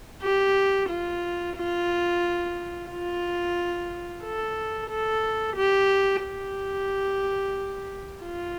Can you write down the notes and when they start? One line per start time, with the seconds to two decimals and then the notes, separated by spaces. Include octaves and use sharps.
0.23 G4
0.90 F4
1.56 F4
2.90 F4
4.23 A4
4.90 A4
5.56 G4
6.23 G4
8.23 F4